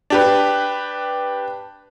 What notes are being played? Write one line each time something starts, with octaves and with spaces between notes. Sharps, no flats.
D4 G4 B4